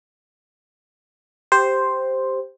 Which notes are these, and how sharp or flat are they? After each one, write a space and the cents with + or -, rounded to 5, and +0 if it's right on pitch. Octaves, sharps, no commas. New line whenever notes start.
G4 +0 C5 +0